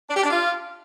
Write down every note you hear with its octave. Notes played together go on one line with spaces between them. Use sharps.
D4
G4
D4
F4